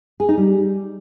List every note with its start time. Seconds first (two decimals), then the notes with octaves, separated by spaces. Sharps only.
0.20 G#4
0.29 D#4
0.37 G3